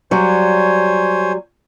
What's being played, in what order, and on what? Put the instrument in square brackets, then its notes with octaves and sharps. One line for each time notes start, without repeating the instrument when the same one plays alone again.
[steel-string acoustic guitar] F#3 G3 [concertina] C5 C#5 G#5